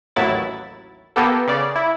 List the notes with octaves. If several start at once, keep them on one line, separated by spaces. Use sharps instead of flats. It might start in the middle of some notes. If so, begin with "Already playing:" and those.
A1 D#2 F#3 E4 A6
A#3 B3 G4 A4
C#3 D5
E4